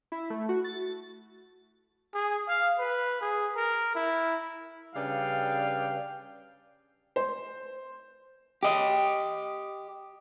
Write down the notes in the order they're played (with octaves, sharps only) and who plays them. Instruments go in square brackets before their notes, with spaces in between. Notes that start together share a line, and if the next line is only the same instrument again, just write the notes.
[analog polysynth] E4
A3
F#4
A6
[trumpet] G#4
F5
B4
G#4
A#4
E4
[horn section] C#3 G3 D4 B4 F5 G5
[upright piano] C5
[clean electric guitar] G4 D#5